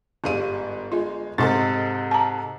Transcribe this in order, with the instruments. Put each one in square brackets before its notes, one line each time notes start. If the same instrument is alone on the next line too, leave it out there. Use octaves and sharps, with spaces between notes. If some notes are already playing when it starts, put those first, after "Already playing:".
[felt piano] G1 F5 D#7 [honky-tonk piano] G#2 G3
[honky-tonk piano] G#3 [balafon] F4
[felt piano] G#2 C3 C6 [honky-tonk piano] A4 D#5 A6
[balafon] A5 A#5